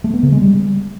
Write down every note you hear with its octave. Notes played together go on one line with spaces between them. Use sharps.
A3
B3
C#3
G#3
G3